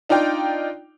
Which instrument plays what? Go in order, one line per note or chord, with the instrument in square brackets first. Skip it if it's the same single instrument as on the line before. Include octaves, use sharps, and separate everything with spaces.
[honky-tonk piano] D4 D#4 F4 D5 G5